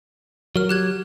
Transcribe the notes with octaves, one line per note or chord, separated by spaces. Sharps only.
F#3 A#4 F6
G4 F#6 G#6